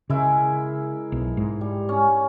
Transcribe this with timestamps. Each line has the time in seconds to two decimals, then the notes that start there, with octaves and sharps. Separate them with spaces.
0.10 C#3 G#3 E4 A#4
1.12 B1
1.37 G#2
1.61 G3
1.89 C#4